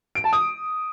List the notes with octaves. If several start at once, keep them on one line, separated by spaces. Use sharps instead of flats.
D7
A5
D#6